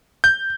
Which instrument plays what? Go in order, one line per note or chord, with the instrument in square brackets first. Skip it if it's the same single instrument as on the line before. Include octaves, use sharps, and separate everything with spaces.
[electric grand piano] G6